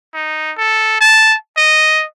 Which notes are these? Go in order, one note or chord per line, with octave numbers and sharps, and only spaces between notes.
D#4
A4
A5
D#5